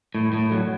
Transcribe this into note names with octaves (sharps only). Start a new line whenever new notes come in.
A2
A2
F#3